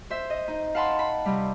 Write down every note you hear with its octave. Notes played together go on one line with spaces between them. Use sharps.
C5 E5
D#5
D#4
F5 F#5 A5 B5 C6
B5
C3 G3